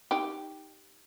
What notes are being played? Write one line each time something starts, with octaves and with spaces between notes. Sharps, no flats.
D#4 G4